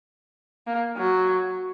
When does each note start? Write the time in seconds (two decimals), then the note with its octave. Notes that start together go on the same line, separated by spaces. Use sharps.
0.67 A#3
0.97 F#3